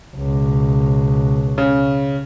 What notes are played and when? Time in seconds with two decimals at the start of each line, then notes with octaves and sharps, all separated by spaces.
0.16 C#2 B2
1.58 C#3